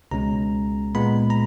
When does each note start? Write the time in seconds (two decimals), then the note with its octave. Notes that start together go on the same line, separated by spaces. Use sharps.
0.11 C#2 B2 G#3 C#4 A#5
0.95 A#2 G#3 B3 B5
1.30 A#5